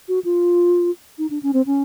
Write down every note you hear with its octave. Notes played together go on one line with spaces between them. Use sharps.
F#4
F4
D#4
D4
C#4
C4
C#4